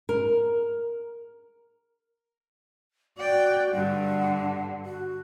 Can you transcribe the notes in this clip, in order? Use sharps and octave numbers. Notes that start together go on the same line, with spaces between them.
A#4
F#4 D5 G5
G2 D3 F#5
F#4